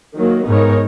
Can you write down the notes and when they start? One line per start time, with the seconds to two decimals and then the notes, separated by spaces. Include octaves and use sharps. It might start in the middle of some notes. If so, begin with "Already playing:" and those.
0.15 D#3 F#3 A#3
0.46 G#2 B3 D#4 A#4 C#5